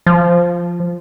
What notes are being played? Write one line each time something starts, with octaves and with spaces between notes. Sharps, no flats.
F3